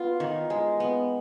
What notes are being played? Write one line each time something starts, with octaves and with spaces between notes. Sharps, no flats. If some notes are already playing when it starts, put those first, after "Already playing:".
Already playing: B3 F4
D#3
G#3
B3